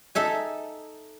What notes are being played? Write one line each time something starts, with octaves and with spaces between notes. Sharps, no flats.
D#4 A4 E5 G#5